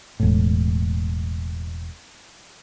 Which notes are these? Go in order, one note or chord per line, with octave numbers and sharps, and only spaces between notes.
E1 A2